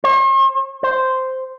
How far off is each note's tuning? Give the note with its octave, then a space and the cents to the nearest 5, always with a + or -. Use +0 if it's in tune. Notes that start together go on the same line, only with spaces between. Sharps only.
C5 +45
C5 -5